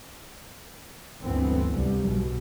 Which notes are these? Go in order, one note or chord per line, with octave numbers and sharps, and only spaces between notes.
G1 D2 E3 B3 C4
C2 G3
B1 B2